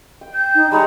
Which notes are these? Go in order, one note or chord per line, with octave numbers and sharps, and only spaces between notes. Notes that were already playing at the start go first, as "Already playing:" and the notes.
G5
G6
D#4
G3 G#3 C#5 A#5 B5